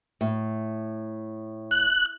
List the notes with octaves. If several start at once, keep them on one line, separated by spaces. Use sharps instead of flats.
A2
F#6